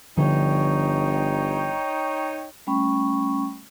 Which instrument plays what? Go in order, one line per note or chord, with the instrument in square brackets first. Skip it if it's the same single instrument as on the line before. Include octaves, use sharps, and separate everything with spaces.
[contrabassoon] G1 [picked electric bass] D3 F3 [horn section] D#4 C#5 G5
[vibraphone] G3 A3 C#4 G5 B5 C#6